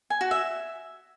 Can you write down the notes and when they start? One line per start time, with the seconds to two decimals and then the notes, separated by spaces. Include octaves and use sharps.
0.10 G#5
0.21 F#4
0.31 E5